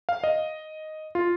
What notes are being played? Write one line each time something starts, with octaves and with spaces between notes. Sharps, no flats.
F5
D#5
F4